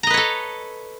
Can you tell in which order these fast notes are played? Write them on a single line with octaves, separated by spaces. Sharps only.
A#5 D#5 B4 C#5 A4